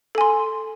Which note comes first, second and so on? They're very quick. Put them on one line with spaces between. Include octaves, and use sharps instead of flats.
A4 G#5 C6